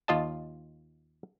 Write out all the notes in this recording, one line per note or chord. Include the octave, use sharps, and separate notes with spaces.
D#2 F4 D#5 A5